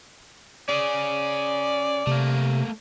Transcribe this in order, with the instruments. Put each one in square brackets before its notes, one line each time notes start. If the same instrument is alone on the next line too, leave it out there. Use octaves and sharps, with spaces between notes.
[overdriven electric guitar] C#4 G#4 [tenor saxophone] D5
[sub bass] C3 [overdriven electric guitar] A3 A#3